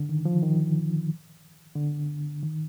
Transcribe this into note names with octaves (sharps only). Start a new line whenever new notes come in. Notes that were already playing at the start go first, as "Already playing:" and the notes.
Already playing: D3
D#3
F3
D#3
D3
D#3